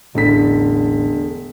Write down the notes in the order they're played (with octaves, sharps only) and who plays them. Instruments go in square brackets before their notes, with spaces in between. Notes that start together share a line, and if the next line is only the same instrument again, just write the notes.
[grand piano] E1 D3 B6 [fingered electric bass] A1